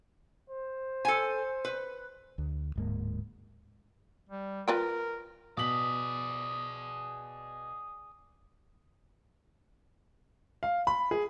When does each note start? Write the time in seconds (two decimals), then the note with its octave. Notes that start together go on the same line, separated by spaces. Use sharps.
0.50 C5
1.05 A4 G#5
1.65 B4
2.38 D2
2.76 D1 G#2 A#3
4.30 G3
4.68 F4 A#4 B4 G5
5.57 B2 G#4 D5 D#6 B6 F#7
10.63 F5
10.87 B5
11.11 G#4